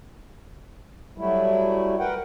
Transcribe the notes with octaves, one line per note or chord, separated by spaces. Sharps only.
F#3 G3 A3 E4
A#4 B4 F#5 G5